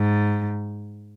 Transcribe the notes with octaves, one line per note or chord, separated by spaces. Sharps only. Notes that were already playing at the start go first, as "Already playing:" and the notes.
Already playing: G#2